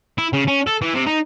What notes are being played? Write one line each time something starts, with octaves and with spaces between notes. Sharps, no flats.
E4
C#3
C#4
A4
E3
C3
D#4